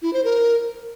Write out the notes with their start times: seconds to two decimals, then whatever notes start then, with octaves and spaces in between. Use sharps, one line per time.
0.02 E4
0.13 C5
0.24 A#4